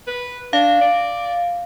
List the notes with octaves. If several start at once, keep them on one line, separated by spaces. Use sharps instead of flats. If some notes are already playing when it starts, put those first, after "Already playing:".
B4
D4 F5
D5